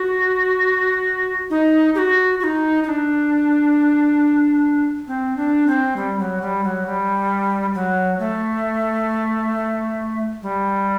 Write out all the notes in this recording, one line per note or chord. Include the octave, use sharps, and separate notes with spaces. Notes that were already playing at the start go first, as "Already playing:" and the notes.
Already playing: F#4
D#4
G4
F#4
F#4
D#4
D#4
D4
C4
D4
C4
G3
F#3
G3
F#3
G3
F#3
A3
G3